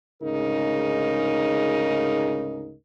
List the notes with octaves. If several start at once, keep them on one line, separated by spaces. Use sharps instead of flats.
D2 G#2 C#3 D#4 A#4